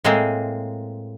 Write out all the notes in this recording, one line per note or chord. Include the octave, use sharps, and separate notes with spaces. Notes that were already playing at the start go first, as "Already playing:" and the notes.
A2 G#3 A#3 C4 G#4